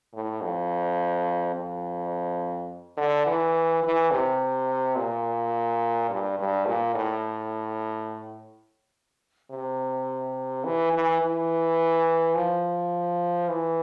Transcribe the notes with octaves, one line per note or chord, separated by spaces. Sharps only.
A2
F2
F2
D3
E3
E3
C3
A#2
G2
G2
A#2
A2
C3
E3
E3
E3
F3
E3